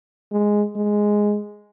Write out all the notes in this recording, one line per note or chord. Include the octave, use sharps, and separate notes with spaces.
G#3
G#3